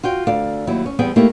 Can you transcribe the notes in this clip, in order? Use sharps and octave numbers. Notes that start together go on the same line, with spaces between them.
F4 F#4 G5
D2 A4 D5 F5
D#2 F#3 E4
C#4
E2 G3 B3 C4 G#4 G5
A3 A#3 D#4 E4 G4